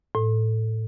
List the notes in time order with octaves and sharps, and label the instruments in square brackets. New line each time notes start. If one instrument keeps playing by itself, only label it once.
[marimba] A2